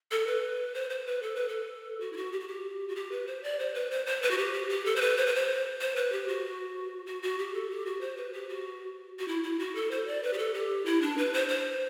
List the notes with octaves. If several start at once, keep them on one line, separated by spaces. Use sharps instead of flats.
A4
B4
C5
C5
B4
A4
B4
A4
F#4
E4
F#4
G4
F#4
G4
F#4
G4
B4
C5
D5
C5
B4
C5
C5
B4
F#4
G4
G4
G4
A4
C5
B4
C5
B4
C5
C5
B4
G4
F#4
F#4
F#4
G4
A4
G4
F#4
C5
B4
G4
F#4
F#4
E4
E4
F#4
A4
C5
D5
B4
G4
A4
G4
E4
D4
B4
C5
C5